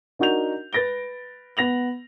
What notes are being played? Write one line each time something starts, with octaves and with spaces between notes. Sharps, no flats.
D4 D#4 F#4 A#4 G6 F7
B4 A6 A#6 D7 G7
B3 A#6 F7 F#7